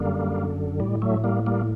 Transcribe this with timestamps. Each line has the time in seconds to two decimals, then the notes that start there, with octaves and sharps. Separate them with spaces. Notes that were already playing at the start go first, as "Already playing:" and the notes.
Already playing: F#2 D3 G3 A#3
0.80 A2 G3
1.02 F#3 A3
1.24 G3 A#3
1.46 G3 A#3